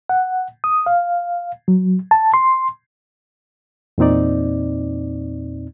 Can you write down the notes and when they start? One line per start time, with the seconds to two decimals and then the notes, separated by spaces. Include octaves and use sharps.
0.09 F#5
0.64 D#6
0.86 F5
1.68 F#3
2.11 A5
2.34 C6
3.98 E2 A#2 C4 D#4 D5